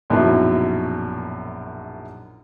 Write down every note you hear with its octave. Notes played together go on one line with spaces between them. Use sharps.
A#1 F#2 B2 C#4 D#4 E4